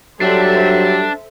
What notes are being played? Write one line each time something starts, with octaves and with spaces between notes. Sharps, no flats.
F#3 G3 D4 A4 C5 E5